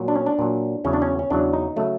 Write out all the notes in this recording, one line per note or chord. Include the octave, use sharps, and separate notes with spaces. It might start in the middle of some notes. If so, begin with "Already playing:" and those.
Already playing: A#2 F#3
D4
C#4
D4
A#2 F#3
E2 C#3 F#3 C#4
D4
C#4
C#4
E2 C#3 F#3 D4
D#4
C#3 F#3 A3